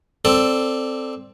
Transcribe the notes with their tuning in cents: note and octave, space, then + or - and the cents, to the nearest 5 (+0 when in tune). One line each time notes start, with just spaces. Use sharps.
C4 +0 A4 +10 D5 +0